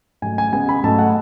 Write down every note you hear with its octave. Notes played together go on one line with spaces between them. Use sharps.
G#2 F#3 A3 G#5
G#5
C#3 G#3 B3 G#5
B5
G#2 F#3 A3 A5
F#5